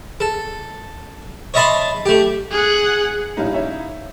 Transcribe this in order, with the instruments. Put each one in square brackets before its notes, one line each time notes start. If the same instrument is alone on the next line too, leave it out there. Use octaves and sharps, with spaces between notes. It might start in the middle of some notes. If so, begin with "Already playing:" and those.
[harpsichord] A4
C#5 D#5 E5 A5 B5 C6
A3 G4
[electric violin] G#4 F#5
[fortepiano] A#1 G3 C#4 [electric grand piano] D#4 E4 F5
[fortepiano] C#5 E5